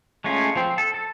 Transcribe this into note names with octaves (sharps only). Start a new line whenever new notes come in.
G#3 A3 C#4 F4
F3 C4
A4
A4